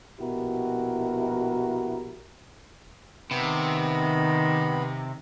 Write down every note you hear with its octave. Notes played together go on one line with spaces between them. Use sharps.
A#1 B2 E4 F#4 G4 A#4
C3 D#3 B3 B5